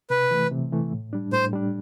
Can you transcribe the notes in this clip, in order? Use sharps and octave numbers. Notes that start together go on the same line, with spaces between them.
C3 B4
E3 A3
C3
E3 A3
A2
G3 D4
A2 C5
G3 D4